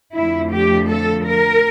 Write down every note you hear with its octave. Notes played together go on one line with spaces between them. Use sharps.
F2 D3 F3 A3 E4
G4
A4
A#4